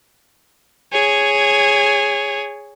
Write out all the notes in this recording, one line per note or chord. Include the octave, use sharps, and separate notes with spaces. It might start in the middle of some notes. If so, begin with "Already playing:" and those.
G#4 C#5